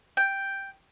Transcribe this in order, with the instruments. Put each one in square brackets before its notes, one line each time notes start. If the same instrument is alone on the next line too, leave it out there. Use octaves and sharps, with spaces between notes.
[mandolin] G5